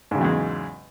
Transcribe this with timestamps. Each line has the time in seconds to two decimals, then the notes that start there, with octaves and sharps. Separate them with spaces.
0.11 G#2
0.15 C#3
0.18 F#3
0.21 E2
0.24 G#3